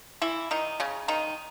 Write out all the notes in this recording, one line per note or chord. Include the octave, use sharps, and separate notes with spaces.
E3 E4
D#3 D#4
C#3 C#4
D#3 D#4